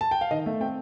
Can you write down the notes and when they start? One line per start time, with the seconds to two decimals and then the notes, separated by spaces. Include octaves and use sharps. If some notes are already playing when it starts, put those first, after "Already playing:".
0.01 A5
0.11 G5
0.21 F5
0.31 D#3 D#5
0.46 A3
0.60 C4 G5